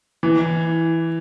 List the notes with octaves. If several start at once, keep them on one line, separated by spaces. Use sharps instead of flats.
E3